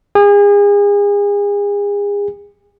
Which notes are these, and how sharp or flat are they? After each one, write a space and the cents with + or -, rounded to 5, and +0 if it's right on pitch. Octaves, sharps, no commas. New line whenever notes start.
G#4 -35